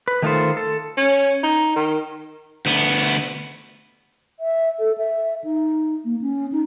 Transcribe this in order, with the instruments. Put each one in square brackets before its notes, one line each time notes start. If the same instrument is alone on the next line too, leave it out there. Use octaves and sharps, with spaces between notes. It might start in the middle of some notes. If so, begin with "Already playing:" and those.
[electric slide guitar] B4
D#3 A3 D#4 F4 A4 C5
A4
[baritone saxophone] C#4
D#4
D#3
[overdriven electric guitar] D2 B3
[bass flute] E5
A4
E5
D#4
A#3
C#4
D#4